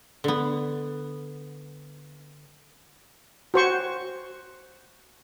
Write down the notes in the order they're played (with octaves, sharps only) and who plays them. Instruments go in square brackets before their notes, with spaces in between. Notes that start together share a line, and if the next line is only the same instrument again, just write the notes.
[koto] D3 B3
[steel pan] F#4 C5 C#6